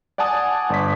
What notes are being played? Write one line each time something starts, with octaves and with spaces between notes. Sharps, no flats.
D5 F#5 G#5 A5 D#6
G1 D5 B6